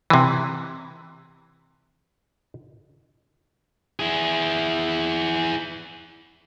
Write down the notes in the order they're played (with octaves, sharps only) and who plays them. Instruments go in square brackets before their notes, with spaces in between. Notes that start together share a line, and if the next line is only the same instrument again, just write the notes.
[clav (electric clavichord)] C3 E3
[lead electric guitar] E4 G#4